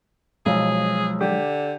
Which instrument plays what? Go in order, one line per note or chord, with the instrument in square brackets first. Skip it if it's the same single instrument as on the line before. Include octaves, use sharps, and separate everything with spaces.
[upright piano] B1 [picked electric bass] F3 F#3 G#3 [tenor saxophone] G#4
[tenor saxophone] D3 [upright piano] G4